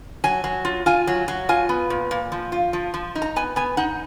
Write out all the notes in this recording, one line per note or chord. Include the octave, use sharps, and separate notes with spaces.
F#3 G#5
F#3
F4
F4 G#5
F#3
F#3
F4 G#5
B3
A#2
A#2
F3
F4
F3
F3
D#4
A#5
B3 G#5
B3 G#5
D#4 F#5